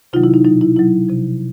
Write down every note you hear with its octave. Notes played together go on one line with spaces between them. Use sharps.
C3 D#3 F#3 D#4 F4
E4
D#4
B2 F#3 D#4
E4
B2 F#3 E4
C3 F3